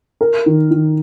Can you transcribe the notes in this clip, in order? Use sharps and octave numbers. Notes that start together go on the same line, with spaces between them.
A#4
D#3
D#3